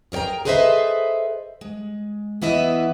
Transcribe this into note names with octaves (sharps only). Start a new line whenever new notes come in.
G#4 A#4 C#5 G5 A#5
G#4 A4 B4 C5 D#5 E5
G#3
E2 E3 B3 E4 D#5 E5